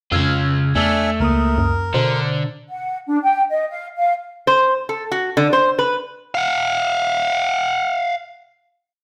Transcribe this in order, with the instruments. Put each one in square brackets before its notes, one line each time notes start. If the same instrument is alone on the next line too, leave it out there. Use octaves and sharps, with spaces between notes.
[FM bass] F2 [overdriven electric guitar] C#3 F4 [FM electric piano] E6 F6 G#6
[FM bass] E2 [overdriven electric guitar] A3 [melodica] D4 E5 G#5
[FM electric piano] C#2 A#3 D#6 [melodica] A#4
[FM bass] F#2
[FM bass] B2 [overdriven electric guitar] D3 [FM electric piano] C5
[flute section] F#5
D4
G5
D#5
F5
F5
[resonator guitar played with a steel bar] C5
A4
F#4
D3
C5
B4
[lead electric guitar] F5 F#5